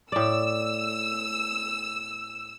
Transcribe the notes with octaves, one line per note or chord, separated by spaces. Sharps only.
A2 D5 E6